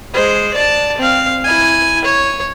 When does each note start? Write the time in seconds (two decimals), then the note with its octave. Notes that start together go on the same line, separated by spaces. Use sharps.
0.13 G#3 C5
0.54 D5 A5
0.98 C4 F5
1.44 E4 G#5
2.04 C#5